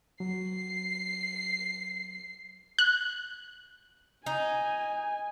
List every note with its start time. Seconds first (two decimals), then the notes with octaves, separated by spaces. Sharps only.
0.20 F#3 C7
2.79 F#6
4.26 D#4 G#5